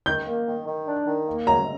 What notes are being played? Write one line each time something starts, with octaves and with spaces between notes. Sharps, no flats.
D#3 G6
A#3
D#3
D#3
D4
D#3
A#3
F#3 A#5